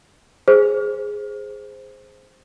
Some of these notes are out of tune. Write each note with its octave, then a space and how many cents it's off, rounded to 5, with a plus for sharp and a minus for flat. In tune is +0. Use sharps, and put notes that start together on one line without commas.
G#4 +0 C5 +0